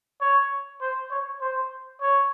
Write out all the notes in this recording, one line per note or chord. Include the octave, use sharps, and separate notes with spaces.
C#5
C5
C#5
C5
C#5